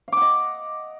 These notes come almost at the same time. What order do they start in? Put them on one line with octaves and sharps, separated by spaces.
F5 D6 F#5 D#5